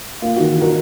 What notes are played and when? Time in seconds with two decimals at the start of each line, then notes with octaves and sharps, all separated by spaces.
0.22 A#3 F4
0.36 D#3 F#4
0.57 D#4 F#4 A#4